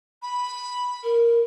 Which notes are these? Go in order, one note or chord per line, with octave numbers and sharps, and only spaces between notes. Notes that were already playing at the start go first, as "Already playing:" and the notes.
B5
A#4